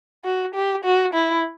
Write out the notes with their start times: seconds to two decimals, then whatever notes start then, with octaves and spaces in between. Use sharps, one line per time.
0.25 F#4
0.55 G4
0.85 F#4
1.14 E4